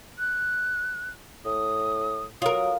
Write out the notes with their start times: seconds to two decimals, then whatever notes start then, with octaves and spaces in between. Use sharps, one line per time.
0.19 F#6
1.46 A2 D#6
2.42 F#3 F4 A#4 D#6